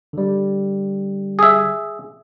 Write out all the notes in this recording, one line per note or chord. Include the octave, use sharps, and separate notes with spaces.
D3 G3
G#4 E5